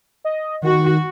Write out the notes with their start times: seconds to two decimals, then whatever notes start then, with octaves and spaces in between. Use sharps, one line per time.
0.25 D#5
0.63 D#3 F#4